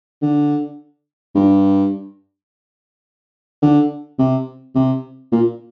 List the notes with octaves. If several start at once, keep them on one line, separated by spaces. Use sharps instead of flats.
D3
G2
D3
C3
C3
A#2